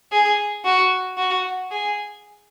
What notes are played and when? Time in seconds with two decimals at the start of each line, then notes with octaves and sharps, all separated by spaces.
0.12 G#4
0.65 F#4
1.17 F#4
1.71 G#4